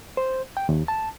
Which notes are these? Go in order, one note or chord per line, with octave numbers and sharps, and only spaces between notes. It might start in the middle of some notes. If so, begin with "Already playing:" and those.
C5
G5
D#2
A5